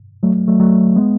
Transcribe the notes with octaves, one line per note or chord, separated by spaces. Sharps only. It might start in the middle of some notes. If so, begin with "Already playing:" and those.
F#3 A3
F#3 A3
F#3 A3
G#3 B3